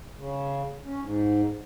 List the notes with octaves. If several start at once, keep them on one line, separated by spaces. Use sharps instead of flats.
C#3
C#4
G#2